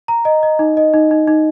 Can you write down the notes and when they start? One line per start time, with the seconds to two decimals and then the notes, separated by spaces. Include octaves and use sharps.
0.08 A#5
0.25 D#5
0.43 D#5
0.59 D#4
0.77 D#5
0.94 D#4
1.11 D#4
1.28 D#4